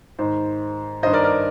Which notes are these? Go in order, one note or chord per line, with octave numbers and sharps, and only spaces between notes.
G#2 D#3 C5
G2 D#3 C5 D#5
A#4 D5
A#4 D5